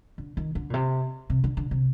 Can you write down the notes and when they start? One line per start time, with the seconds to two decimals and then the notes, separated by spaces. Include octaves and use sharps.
0.18 D3
0.37 D#3
0.55 D3
0.70 A#2
0.74 C3
1.30 C3
1.44 D3
1.57 D3
1.71 C3